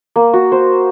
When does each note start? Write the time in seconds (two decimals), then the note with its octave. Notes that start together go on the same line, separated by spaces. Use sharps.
0.16 A#3
0.34 F#4
0.52 C5